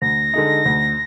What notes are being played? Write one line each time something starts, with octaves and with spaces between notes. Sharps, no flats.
D2 A#6
D3 G#3 D#4
D2